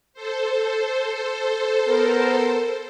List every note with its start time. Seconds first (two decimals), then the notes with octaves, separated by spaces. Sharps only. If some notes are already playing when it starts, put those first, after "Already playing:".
0.13 A4 C5
1.88 B3 A#4